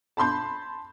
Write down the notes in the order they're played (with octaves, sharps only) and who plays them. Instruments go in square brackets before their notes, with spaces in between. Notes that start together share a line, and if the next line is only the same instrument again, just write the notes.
[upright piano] A5 B5 C6 G6